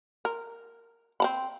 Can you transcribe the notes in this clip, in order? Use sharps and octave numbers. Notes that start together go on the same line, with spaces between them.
A#4
C4 A#5 B5